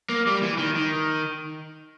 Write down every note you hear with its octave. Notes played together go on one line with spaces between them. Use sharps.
A#3
G3
E3
D#3
D#3